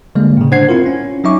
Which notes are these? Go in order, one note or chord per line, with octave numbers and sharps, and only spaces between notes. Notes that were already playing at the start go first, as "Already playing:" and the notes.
D3 G3 G#3 A#3
A2 C#3
D4 C5 F#5 G#6 C7
C4 E4 F4 A#4
C#4
F#3 C#4 D#4 E5 C#6 D6